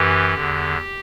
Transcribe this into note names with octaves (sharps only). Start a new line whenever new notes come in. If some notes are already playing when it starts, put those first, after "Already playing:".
Already playing: F#2 E3 G4
E2 D3